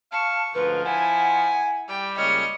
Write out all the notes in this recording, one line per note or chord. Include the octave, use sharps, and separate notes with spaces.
F5 A5 C#6
D2 G#2 F3 A#4 B4
E4 F#5 G#5
G3 G5
C#2 G#3 A#3 C#5 D#5 F6